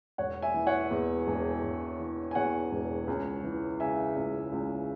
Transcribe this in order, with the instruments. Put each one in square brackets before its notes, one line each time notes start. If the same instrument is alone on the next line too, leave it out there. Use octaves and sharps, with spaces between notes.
[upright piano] E1 C#5 F#5
E5 G#5
E3
C#5 F#5
E2
E1
E1
E3
G#5
E2 C#5 F#5
E1
C#2
E3
C#3 E5 G#5
C#2
C#2